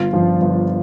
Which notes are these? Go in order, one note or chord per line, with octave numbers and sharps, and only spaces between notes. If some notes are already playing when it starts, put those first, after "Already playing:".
Already playing: G1 F4
G2 F3
G1